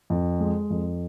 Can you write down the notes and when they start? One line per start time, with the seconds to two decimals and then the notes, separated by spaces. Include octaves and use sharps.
0.10 F2
0.40 G#3
0.70 F2